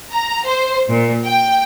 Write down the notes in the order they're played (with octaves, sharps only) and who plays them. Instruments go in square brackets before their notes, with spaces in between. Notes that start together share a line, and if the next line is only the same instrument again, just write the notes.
[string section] A#5
C5
A#2
G5